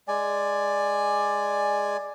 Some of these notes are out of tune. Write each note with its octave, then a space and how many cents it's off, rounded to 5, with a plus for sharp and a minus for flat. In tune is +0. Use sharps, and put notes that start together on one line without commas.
G#3 +0 D5 +10 G#5 +0